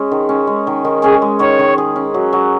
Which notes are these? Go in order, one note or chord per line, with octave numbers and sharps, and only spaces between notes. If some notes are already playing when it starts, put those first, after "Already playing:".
Already playing: G#3 C#4
D#3
C#4
G#3
D#3
D#3
C#4 G#4
G#3
D#3 C#5
D#3
G#4
C#4
F#3
F#3